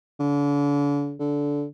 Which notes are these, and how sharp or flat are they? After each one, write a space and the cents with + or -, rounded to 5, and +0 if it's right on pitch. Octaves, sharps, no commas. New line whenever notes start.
D3 -40
D3 -15